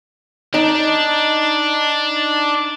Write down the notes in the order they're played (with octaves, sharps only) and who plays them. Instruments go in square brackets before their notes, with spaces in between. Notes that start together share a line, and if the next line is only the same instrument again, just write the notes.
[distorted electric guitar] D4 [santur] D#4